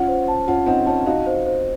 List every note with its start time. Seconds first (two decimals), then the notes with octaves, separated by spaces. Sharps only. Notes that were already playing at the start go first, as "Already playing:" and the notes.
Already playing: C#4 F4 F#5
0.08 C5
0.28 A5
0.48 C#4 F4 F#5
0.66 C4 D#4 F#5
0.86 C#4 F4 A5
1.06 D#4 F#4 F5
1.26 C5
1.46 C5